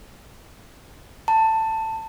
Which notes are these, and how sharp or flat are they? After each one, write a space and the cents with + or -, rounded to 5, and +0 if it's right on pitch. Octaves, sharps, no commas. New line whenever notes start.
A5 +15